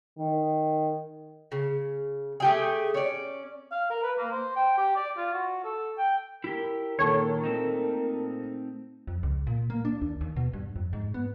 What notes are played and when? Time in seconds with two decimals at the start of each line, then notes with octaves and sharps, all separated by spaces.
0.18 D#3
1.52 C#3
2.40 A3 G4 G#4
2.94 C#4 D5
3.71 F5
3.90 A#4
4.03 B4
4.18 A#3
4.32 C5
4.56 G5
4.77 G4
4.96 D5
5.17 F4
5.33 F#4
5.64 A4
5.97 G5
6.44 E4 G4 A#4
6.99 A#2 D#3 A4 C#5
7.44 A3 C4 D#4
9.07 F2
9.23 C#2
9.47 A#2
9.70 A#3
9.85 D4
10.02 D#2
10.21 D#2
10.36 B2
10.53 G2
10.76 F2
10.93 G#2
11.14 B3